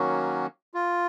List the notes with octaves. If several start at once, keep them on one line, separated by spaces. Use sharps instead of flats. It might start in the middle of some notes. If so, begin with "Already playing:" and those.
Already playing: D#3 F#3 A#3 C#4 F#4
F4